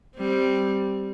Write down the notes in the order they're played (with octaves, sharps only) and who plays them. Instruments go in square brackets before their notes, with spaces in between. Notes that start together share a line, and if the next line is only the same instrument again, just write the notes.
[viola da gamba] G3 C4